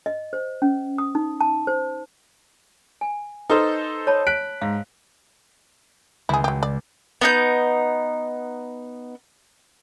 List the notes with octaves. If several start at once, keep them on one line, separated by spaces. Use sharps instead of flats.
D#5
C5
C#4
D#6
D#4
A5
C5
G#5
D#4 A4 B4 C5
C#5 A5 B5
F#6 B6 D7
G#2 F5
C#2 E4 G#4
F#3 G4
D5
B3 D#4 G6